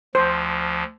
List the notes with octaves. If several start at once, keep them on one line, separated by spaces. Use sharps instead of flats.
D2 F3 C5